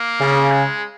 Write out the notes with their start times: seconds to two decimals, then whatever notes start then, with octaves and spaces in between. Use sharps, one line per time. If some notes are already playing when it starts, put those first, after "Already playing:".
Already playing: A#3
0.20 C#3
0.51 G#3